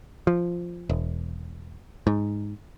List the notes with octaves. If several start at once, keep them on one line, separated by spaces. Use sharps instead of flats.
F3
E1
G#2